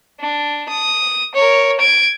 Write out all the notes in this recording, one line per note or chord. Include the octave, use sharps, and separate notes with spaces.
D4
D#6
A#4 C#5
G#6 D7